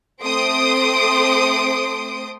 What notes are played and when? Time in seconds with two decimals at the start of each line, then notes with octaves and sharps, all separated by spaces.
0.23 A3 C4 C6 D#6 D7